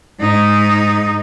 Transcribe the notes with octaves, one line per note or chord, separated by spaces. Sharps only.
G#2 D#4